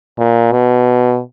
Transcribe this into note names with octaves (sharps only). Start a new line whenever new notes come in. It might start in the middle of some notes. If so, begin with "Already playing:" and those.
A#2
B2